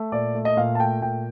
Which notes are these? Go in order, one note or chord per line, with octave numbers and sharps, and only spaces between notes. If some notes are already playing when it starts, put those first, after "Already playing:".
Already playing: A3
A#2 D5
A3
D#5
A#2 F5
A5
A3 G5
A#2 G5